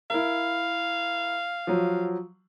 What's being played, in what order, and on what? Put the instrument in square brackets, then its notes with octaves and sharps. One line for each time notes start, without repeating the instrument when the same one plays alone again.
[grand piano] E4 A#4 [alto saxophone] F5
[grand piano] F3 F#3